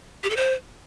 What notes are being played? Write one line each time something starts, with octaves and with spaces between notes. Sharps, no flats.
G4
A4
C5